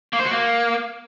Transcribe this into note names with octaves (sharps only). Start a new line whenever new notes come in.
A#3
C5
F#4
A#3